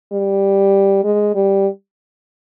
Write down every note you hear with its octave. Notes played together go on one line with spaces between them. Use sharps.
G3
G#3
G3